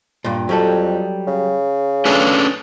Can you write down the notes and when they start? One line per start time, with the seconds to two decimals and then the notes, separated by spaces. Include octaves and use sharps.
0.24 G2 A#2
0.49 F2 F#3 G3 A4
1.27 C#3
2.05 A3 C#4 D4 G#4 B4 G#5